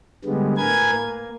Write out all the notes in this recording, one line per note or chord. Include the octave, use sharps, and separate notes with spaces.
D3 G3 G#3 B3
A2 A#4 B4 G#5 G#6
A#3